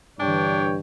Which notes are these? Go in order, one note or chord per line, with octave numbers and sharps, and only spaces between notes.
G2 D3 E3 D4 C#5 G5